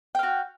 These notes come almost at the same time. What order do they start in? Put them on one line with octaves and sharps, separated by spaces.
G5 F5 F#4